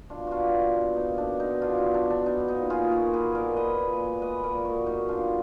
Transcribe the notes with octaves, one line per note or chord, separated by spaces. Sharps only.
B2 D4 F4
B2 D4 F4 F#4
B2
B2
A#3 D#4
B2 D4
B2 D#4
B2 D4 F4
D#4
F#3
D4
B2
D4
B3 D#4
A#2 D#4
A#2 F4 G#4
A#2 F#4 A#4
A#2 G#4 B4
B3 A#4 D5
B3 B4 D#5
A#2
B3
G#3 B4 D#5
A#2 A#4 D5
B3 F#4 A#4
F#3 D#4 F#4
D3 D4 F4